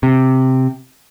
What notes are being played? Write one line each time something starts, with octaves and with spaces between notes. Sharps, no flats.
C3